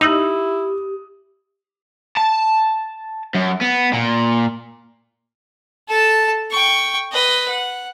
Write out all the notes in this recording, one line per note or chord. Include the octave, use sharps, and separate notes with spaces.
D#4 E4 G4 D#6 E6 F#7
A5
F#2
B3
A#2
A4 A5
G5 C#6
B4 D#5
F#5